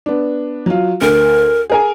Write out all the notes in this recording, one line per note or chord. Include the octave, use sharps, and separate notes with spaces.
B3 D4
F#3 F4
D2 A#4
G#4 A#4 G#5